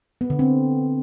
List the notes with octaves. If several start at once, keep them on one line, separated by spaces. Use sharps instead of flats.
B3
D3
C4